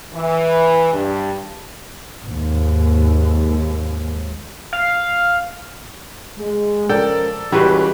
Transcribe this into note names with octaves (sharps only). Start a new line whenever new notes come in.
E3
G2
D#2 G#2
F5
G#3
C#2 F3 A4 A#4 D5 G5
C#2 E3 G3 F#4 G4 B4 C5